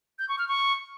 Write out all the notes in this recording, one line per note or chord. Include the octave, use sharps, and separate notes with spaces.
G6
C#6
F6
C#6